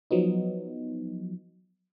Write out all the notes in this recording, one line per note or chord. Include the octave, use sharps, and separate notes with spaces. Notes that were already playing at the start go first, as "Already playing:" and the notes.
F3 F#3 B3 D#4